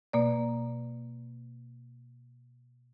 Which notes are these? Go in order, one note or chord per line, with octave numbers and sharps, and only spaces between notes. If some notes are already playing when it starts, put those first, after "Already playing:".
B2 A#3 D5